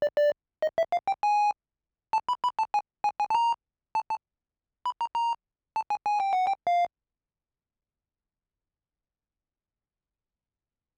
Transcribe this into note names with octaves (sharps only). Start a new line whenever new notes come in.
D5
D5
D#5
E5
F5
G5
G#5
A5
B5
B5
A5
G#5
G#5
G#5
A5
A#5
A5
A5
B5
A#5
A#5
A5
G#5
G#5
G5
F#5
G5
F5